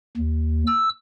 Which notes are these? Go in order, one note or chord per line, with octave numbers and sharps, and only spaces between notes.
D#2
E6